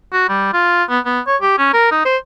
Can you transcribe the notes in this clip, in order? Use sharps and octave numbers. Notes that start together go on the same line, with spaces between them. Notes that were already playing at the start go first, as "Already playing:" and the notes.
F#4
G3
F4
B3
B3
C#5
G4
C#4
A#4
D#4
C5